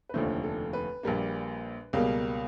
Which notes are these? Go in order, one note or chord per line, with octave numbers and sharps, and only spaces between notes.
B4
F1 D#2 D3 F3 A3 C5
A4
B4
A#1 A#2 G3 A#3
C#2 B2 G3 A#3